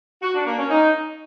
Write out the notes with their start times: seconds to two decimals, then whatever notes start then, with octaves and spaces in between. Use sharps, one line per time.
0.22 F#4
0.34 D4
0.46 A#3
0.58 C#4
0.70 D#4